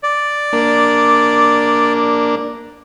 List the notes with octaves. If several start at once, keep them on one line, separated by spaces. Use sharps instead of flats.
D5
A#3 D4